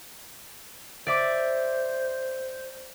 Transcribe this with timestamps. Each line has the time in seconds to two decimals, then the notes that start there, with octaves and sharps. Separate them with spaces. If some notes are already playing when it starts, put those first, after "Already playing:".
1.07 C5 D5 E5 D6